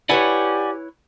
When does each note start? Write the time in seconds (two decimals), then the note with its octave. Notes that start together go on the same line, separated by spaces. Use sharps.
0.09 E4 G4 B4 C#5 D5 F#5 G#5